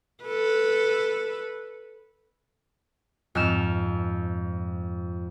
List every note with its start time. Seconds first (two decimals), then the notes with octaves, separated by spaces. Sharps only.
0.24 A4 B4
3.35 F2 G#2 F6 E7